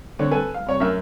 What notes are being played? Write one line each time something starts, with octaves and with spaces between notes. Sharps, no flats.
D3 C4 C#5
A4 B4 G#5
F5
C3 C#5 C#6
F#2 A#4 E5 E6 F6